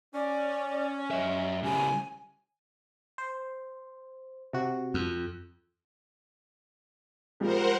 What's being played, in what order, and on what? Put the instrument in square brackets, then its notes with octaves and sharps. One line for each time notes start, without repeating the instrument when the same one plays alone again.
[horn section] C#4 [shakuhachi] D5
[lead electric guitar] F#2 E5 [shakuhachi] D#5
[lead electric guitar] C#3 G3 [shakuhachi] G#5
[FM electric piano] C5
C3 F#4
[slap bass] F2
[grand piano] F3 G3 G#3 [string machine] A#4 C5 F#5